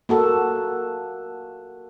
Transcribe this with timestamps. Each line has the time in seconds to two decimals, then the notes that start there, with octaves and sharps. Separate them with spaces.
0.09 A#3 F#4 A4